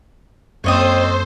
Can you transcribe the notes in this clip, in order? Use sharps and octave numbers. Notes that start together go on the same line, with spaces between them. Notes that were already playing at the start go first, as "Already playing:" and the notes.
F#2 A#3 C4 A4 C5 C#5 D#5 D#6